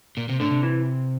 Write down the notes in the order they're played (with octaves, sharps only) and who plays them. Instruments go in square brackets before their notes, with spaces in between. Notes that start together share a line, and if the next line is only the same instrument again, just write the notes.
[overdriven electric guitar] A#2
C3
[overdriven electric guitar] A2 [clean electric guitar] D3
[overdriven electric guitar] C3
[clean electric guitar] E3